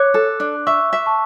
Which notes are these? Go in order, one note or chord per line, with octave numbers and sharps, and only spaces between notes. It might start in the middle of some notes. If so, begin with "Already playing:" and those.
Already playing: C#5 D6 F#6
A4
D4
E5 C#6 E6
E5
A5 C#6